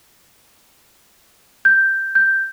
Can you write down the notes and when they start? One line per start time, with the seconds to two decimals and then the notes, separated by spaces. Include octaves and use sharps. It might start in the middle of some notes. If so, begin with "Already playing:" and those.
1.65 G6
2.15 G6